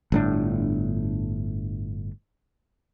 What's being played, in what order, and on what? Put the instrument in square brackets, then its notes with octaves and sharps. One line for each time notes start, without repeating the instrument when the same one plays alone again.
[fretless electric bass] G1 A2 D4